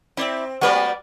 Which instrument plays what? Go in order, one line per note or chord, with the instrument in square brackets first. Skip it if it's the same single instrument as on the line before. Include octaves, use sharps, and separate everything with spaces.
[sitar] C4 [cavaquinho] E4 D5 E5
[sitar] G3 A3 A#3 [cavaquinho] F#4 B4 D5